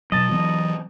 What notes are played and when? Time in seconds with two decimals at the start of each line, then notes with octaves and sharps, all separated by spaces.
0.12 B2 F#3 D#5 A5
0.31 E3 F#3 B3